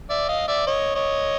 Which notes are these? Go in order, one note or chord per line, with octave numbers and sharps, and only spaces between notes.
D5 E5
D#5 F5
D5 E5
C#5 D#5
C#5 D#5